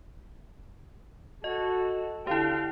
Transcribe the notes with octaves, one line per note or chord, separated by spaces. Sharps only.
F#4 A4 D#5
D3 E4 G4 F5 G5